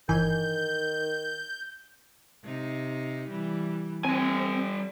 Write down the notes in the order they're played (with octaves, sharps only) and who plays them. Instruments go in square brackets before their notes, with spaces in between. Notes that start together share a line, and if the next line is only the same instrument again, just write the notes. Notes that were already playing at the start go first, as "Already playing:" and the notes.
[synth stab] G1 E3 G#5 [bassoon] D#3 [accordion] G6
[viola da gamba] C3 D#4
E3 G3
[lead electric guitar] G3 G#5 [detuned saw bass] C4 [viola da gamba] G4